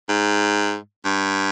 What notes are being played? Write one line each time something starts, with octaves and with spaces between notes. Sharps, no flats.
G#2
G2